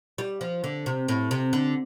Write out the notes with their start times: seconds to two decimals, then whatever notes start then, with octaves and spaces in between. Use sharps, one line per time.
0.18 G3
0.41 F3
0.64 D3
0.86 C3
1.08 A2
1.31 C3
1.53 D3